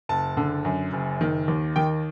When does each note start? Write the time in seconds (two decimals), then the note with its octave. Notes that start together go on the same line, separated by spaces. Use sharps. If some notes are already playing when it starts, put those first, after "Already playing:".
0.09 F#1 A5
0.37 D3
0.65 F#2
0.93 F#1
1.21 D#3
1.48 D#2
1.76 D#3 G5